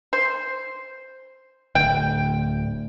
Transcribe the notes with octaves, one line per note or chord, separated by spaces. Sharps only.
C5
D1 D2 G5